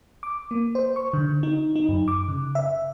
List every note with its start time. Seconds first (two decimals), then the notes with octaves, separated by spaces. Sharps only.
0.23 D6
0.51 A#3
0.75 C5
0.96 C#6
1.13 D3
1.43 D#4
1.76 D#4
1.89 F#2
2.08 D6
2.28 C#3
2.55 E5